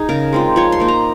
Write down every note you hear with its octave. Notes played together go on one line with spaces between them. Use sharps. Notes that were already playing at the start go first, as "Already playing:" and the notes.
Already playing: D#4 G#4
C#3 A#4
G#3 C4 F4
F3 C#5
C6
A#3 D#4
A#5